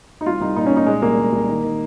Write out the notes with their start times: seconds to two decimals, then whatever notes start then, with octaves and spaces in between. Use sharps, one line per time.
0.21 D#4
0.26 C2 F4
0.41 C2 D#4
0.56 A#2 D#4
0.66 C#4
0.71 A#2 D#4
0.86 A#2 G#3
1.02 C2 A#3
1.18 C2
1.32 C2
1.48 D#3
1.64 D#3